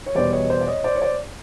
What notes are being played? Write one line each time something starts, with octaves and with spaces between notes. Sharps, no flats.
C#5
E2 B2 G3 B3 C5 D5
C#5 D#5
C5 D5
D5
C#5 D#5
C5 D5
C#5
C5 D5